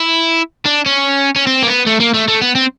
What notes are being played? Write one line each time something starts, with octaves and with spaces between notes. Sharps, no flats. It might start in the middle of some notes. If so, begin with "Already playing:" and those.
Already playing: E4
D4
C#4
C#4
C4
A#3
B3
A3
A#3
A3
A3
B3
C4